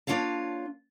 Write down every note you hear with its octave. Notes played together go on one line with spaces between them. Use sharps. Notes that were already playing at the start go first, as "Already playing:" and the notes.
A#3 D4 F4 C#5 F5 A5